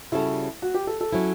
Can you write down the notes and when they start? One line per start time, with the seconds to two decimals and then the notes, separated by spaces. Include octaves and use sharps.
0.12 C#3 G3 C#4 E4 F#4 A4
0.62 F#4
0.74 G4
0.87 A4
1.01 A4
1.13 F#3 C#4 E4